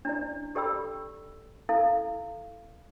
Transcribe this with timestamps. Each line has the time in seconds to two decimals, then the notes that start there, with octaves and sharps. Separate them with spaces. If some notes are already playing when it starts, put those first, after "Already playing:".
0.05 D4 E4 D5
0.55 G4 A4 D5 G5 B5 E6
1.69 E4 A4 F5